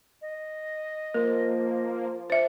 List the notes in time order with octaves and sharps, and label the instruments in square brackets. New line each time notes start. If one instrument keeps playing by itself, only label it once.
[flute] D#5
[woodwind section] F3 [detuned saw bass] A#3 [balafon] A#4
[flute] D4 [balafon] C5 E5